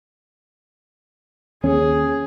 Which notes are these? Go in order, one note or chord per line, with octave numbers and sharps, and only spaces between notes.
D#2 C#4 G#4